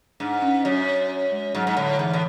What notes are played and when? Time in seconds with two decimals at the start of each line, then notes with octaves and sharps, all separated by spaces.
0.20 G#2 D4
0.42 C#4
0.65 F#2
1.32 G#3
1.55 G#2 F#3
1.67 G#2
1.77 A2 D3
1.99 G#2 E3
2.13 A2